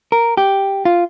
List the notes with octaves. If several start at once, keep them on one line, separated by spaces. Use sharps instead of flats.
A#4
G4
F4